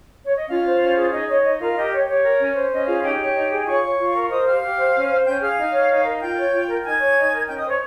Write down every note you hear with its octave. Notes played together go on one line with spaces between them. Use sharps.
C#5
D#5
C#4 F4 F5
C5
C#4
G#4
D#4 D#5
C#5 D#5
D#4 D#5
F4 A#4 F5
G4 D#5
C#5
G4 C#5
A#4
C#4
C5
C#4 D#5
F4 G#4 F5
D#4 G4 G5
C#5
D#4
G#4
F4 C#5 C#6
C#5
F4
A#4
C5 D#5 D#6
G4 F5 F6
G4
C5
C#4
C5
C#4 G5 G6
G#4 F5 F6
D#4
C#5
D#4
A#4
F4 G5 G6
C#5
F4
A#4
D#4 G#5 G#6
C#5
D#4
A#4
C#4 G5 G6
D#5 D#6
C5
C#5 C#6